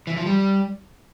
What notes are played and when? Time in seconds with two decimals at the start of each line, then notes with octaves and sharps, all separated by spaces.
0.07 E3
0.17 F3
0.26 G3